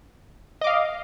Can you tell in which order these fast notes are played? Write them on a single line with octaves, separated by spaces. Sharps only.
D#5 D6 F5